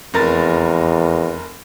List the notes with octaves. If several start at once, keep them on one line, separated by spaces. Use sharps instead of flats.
F1 E2 A#4 A6